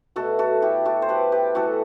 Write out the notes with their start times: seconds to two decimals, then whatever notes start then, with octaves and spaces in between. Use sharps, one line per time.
0.16 B2 A3 F#4 A4
0.39 F#4 A4
0.62 E4 G4
0.85 F#4 A4
1.02 C5
1.09 G4 B4
1.32 G4 B4
1.55 A2 E3 B3 F#4 A4